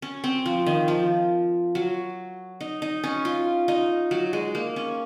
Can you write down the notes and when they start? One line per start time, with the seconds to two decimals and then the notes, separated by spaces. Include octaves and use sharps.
0.02 C#4
0.24 C4
0.46 F3
0.66 D#3
0.88 F3
1.75 F#3
2.61 D#4
2.82 D#4
3.04 C#4
3.25 F4
3.68 D#4
4.11 F#3
4.33 G#3
4.55 A#3
4.76 C#4